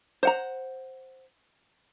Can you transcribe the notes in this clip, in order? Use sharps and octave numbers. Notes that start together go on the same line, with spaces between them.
C5 F#5 A#5